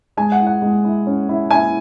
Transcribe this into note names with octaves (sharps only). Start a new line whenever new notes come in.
G#3 G#5
F#5
E4
F#5
G#3
E4
C#4
E4
E4 G#5